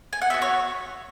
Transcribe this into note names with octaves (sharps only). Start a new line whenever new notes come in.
G#5
F#5
B3 F#4 E5
C#5